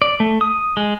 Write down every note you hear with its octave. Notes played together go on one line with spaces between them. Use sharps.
D5
A3
D#6
G#3